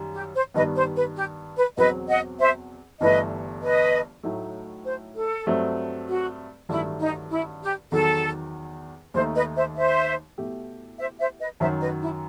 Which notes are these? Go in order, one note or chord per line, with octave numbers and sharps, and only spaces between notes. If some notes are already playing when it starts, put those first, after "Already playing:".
Already playing: F#2 D#3 G3
G4
C5
G2 D#3 G3 B3 B4 D#5
C5
B4
G4
B4
E2 B2 F#3 C4 B4 D#5
D#5 F#5
C5 E5
G1 G2 E3 A3 B4 D#5
B4 D#5
A2 F#3 A3 D#4
C5
A4
G2 F#3 A3 C4
F#4
A1 G2 D#3 F#3 A3 E4
D#4
E4
G4
E2 D#3 F#3 A4
D#2 D#3 A3 D#4 C5
B4 D#5
C5 E5
C5 E5
B2 A3 E4 G4
C5 E5
C5 E5
B4 D#5
F#2 D#3 F#3 C5 E5
B4 D#5
E4